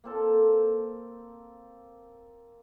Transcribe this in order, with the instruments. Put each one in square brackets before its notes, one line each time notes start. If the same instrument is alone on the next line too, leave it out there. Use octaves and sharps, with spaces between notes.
[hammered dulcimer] A#3 C4 A4